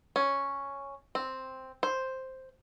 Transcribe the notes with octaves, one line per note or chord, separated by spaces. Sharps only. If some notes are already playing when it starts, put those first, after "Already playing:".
C#4
C4
C5